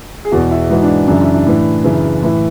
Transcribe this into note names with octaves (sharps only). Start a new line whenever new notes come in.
G#4
E2 B2 F#4
E4
G#2 E3 F#4
D4
F#2 C#3 E3 D4
E4
D4
A2 E3
F#2 C#3 E3
A2 E3 E4